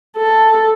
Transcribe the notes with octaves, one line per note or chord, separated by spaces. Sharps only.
A4